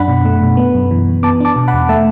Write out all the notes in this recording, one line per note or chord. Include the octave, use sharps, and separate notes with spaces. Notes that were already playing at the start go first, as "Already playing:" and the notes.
Already playing: F#2 D4 F#5 B5
B2
A3
B2
B3
F#2
E3
F#2
B3 A5 D6
D4 A5 D6
B2
F#5 B5
E2
A3 E5 A5